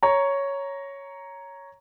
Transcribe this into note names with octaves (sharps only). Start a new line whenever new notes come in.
C#5 A#5